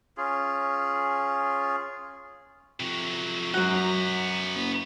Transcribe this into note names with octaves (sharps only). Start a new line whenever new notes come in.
C#4 F4 G#4
F2 C3 F#3
F#2 F#3 G#3 D#4 F#5
B3 A#5
F#1